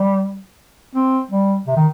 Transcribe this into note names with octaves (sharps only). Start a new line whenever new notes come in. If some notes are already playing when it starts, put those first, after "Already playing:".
Already playing: G3
C4
G3
C3
D#3